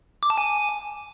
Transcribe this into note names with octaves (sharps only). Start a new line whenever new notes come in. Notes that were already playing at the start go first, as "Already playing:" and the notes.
D6
A5
G#5